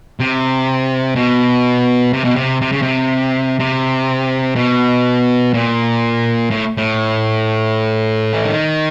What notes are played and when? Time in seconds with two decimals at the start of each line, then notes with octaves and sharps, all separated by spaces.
0.20 C3
1.16 B2
2.13 C3
2.24 B2
2.36 C3
2.61 C3
2.72 C#3
2.82 C3
3.59 C3
4.56 B2
5.54 A#2
6.51 A2
6.77 A2
8.34 E3
8.44 D#3